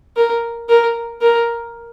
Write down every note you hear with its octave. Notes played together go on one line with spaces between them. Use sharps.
A#4
A#4
A#4